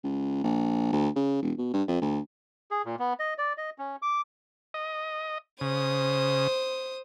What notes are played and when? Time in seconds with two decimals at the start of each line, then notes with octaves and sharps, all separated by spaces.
0.03 C#2
0.44 A#1
0.92 D2
1.16 C#3
1.42 E1
1.58 B2
1.73 G2
1.88 F2
2.01 D2
2.71 G#4
2.85 A#2
2.99 B3
3.19 D#5
3.38 D5
3.58 D#5
3.78 C#4
4.02 D6
4.74 D#5
5.61 C#3 C5 D#6